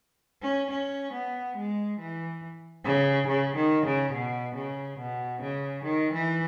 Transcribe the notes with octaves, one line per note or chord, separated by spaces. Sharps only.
C#4
C#4
B3
G#3
E3
C#3
C#3
D#3
C#3
B2
C#3
B2
C#3
D#3
E3